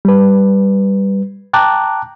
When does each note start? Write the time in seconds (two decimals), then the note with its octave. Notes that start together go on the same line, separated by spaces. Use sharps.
0.05 G3 B4
1.53 G5 A5 A#5 D6 F#6